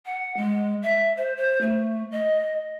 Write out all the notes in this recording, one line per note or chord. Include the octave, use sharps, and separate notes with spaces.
F#5
G#3
E5
C5
C5
A3
D#5